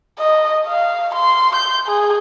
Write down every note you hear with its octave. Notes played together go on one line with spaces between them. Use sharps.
D#5
F5
C6
G6
G#4